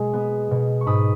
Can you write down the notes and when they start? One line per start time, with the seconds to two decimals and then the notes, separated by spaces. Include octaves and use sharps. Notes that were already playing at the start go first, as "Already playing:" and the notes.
Already playing: B2 G#3
0.13 B3
0.51 B2
0.81 C#6
0.86 G#2 B5 D#6